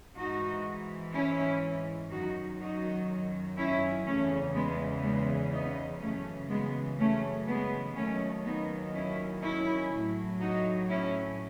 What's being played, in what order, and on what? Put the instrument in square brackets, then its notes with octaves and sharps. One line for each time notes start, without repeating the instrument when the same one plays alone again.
[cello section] G#2 E3 D#4 F#4
C#4 E4
F#2 D#3 F#3 D#4 F#4
D#4 F#4
C#4 E4
E2 C#3 E3 A3 C#4
G#3 B3
G#3 B3
B3 D#4
F#2 C#3 E3 A3 C#4
G#3 B3
A3 C#4
G#3 B3
D#2 D#3 F#3 A3 C#4
B3 D#4
C#4 E4
C#4 E4
A2 F#3
D#4 F#4
C#4 E4